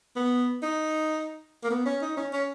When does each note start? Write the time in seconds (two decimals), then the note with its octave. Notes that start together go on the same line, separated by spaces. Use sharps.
0.16 B3
0.62 D#4
1.63 A#3
1.71 B3
1.86 C#4
2.02 D#4
2.17 C#4
2.33 C#4